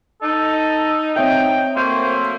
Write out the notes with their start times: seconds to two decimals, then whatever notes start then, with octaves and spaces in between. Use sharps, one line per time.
0.22 D#4 A4
1.16 C4 C#5 E5 G5
1.76 F#3 A3 A#3 C5